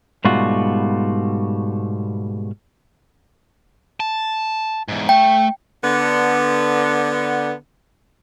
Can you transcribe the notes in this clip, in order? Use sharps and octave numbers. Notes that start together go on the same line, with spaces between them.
G#2 B2 G3 A3 F4 F#4
A5
E2 G#2
A3 G5
D3 B3